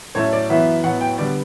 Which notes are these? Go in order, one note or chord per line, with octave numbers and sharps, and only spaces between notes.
A2 F#3 A3 C#4 C#5
D5
F#2 E3 B3 E5
A2 F#3 B3 F#5
G5
D3 G3 B3 D5